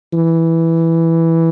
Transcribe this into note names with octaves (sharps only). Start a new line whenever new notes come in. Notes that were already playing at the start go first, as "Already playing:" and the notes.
E3